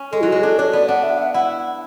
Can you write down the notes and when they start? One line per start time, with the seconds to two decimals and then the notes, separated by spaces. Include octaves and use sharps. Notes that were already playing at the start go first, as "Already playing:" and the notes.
Already playing: C#4
0.12 G#3 A4
0.21 F#3 E4
0.28 G#3 F#4
0.43 D4 A4
0.58 D4 C#5
0.73 B3 D5
0.88 D4 F#5
1.03 E5
1.18 F#5
1.34 E4 F#5